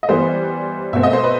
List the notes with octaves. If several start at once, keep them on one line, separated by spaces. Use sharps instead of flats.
D#5
E3 G3 B3 C5
B2 A3 C4 E5
D#5
C5
B4